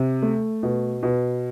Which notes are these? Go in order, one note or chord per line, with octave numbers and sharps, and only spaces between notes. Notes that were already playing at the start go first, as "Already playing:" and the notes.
Already playing: C3
A3
B2
B2